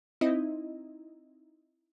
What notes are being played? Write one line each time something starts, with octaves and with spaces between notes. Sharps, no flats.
C4 D#4 E4 D#5